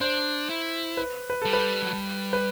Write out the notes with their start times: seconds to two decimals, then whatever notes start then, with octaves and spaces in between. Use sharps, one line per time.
0.01 D4 C5
0.50 E4
0.97 B4
1.30 B4
1.42 G3 A4
1.53 B4
1.82 F#3
1.93 G3
2.33 B4